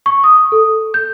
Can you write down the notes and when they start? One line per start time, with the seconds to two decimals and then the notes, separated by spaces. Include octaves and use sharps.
0.06 C#6
0.24 D#6
0.52 A4
0.94 G6